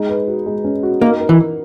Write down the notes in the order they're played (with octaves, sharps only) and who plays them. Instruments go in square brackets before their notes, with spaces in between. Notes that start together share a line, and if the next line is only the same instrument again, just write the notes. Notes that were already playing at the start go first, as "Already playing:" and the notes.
Already playing: [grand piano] G#3 D#4
B4
F#4
G#3
C#4
F#4
[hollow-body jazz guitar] A#3 [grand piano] D#4
[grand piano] A#4
[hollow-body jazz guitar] E3
[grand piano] A#4